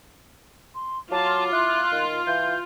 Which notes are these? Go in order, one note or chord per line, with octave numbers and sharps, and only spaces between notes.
C6
F#3 F4 A5 D6
E4 F#6
D#3
E3 F5 G6